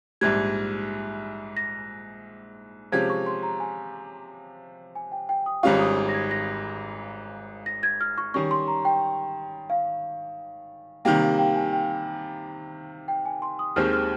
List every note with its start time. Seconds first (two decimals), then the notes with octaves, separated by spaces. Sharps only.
0.21 A#1 G#2 G3 G#6
1.57 A#6
2.92 C3 F3 G#3 C#4 G4 G#6
3.10 C#6
3.26 C6
3.43 A#5
3.60 G#5
4.95 G#5
5.12 G5
5.29 G5
5.46 D#6
5.63 G#1 G#2 G3 C#4 F4 C#6
5.80 D#6
6.09 A#6
6.14 G#6
6.31 A#6
7.66 A#6
7.83 G#6
8.01 F6
8.18 C#6
8.34 D#3 G3 C#4 C#6
8.51 C6
8.68 A#5
8.85 G5
9.70 F5
11.05 C3 D#3 G3 A#3 G5
11.22 F5
11.39 G5
11.55 G#5
11.73 G5
13.08 G5
13.25 G#5
13.42 C6
13.59 D#6
13.76 D#2 D#3 G#3 C4 G4 F6
13.93 F6